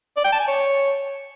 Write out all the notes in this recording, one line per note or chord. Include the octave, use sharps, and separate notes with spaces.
D5
G5
A5
G#5
C#5